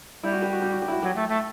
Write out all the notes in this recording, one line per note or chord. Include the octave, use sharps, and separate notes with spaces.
G3 E4
F#4
G4
F#4
G4
F#4
G4
E4
F#4
F#3 G4
A3
A3